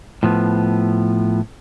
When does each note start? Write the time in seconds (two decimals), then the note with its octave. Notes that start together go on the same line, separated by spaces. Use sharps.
0.23 A2 F3 B3